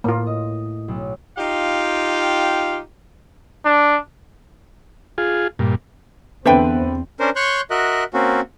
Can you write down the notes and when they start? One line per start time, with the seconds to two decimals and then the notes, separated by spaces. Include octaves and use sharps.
0.04 A2 A#3 F4
0.27 D#5
0.88 B1
1.38 D#4 F4 G4 F5 G5
3.65 D4
5.18 F4 G#4
5.59 G2 A#2
6.45 E2 D3 B3 C4 B4 C5 E5 G5
7.20 C#4 D4 A#4 C5
7.36 C#5 C6 C#6 F#6 G6
7.71 F#4 A#4 D#5 E5 F#6
8.14 A#3 C4 C#4 F#4